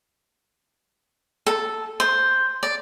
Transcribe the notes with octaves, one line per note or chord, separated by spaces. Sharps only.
A4
C5
D5